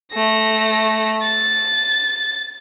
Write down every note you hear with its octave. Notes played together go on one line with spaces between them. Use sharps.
A3 A#6
A6